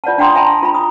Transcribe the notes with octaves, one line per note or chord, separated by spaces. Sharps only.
F4 D5 F#5 A5
D4 F#5 G5 A#5 C6 D#6
E5 G#5 A5 B5 C6
A5
F4 E5 A#5 B5
D#6